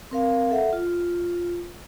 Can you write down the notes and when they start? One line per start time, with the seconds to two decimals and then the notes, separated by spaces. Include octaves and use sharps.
0.11 C4 A#4 F5
0.51 A4 E5 F#5
0.73 F4